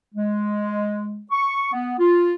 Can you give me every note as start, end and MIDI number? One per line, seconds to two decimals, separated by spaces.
0.15 1.21 56
1.31 1.73 85
1.73 1.95 59
1.99 2.34 65